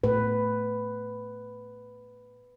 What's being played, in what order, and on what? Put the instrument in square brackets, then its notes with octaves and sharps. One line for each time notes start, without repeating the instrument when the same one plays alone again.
[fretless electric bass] A2 [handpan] B4